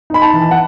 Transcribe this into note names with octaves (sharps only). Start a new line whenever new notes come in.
D#4 B5
A5
E3
F#5